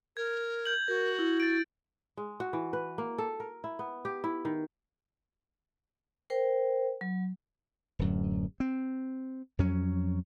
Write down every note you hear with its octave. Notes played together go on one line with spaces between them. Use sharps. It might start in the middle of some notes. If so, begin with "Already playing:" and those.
A#4 G#6
G6 F#7
F#4 A#4
E4
A6 D7
G#3
F#4
E3
B4
A#3
A4
A#4
E4
B3
G4
E4
D#3
A#4 C5 G5
F#3
D1 F#2
C4
F2 F#3 C#4